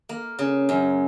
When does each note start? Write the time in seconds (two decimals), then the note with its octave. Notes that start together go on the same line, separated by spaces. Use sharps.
0.09 A#3
0.39 C#3
0.69 F#2